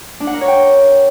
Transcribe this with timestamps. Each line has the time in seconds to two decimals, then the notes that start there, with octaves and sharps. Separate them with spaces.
0.20 D4
0.27 F#5
0.34 A#4
0.41 C#5
0.48 G5